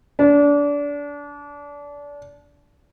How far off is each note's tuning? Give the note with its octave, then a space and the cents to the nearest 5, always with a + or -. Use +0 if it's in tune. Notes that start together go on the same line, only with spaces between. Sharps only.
D4 -25